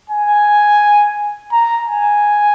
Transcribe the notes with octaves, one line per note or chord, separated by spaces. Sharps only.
G#5
A#5
G#5